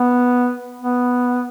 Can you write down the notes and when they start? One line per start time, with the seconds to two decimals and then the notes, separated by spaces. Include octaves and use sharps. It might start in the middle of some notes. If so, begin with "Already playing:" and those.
Already playing: B3
0.82 B3